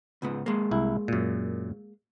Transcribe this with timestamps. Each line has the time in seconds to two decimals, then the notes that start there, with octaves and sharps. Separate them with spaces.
0.22 C#2 G#2 B3
0.46 G#3 A#3
0.71 C2 E4
1.08 F#2 A#2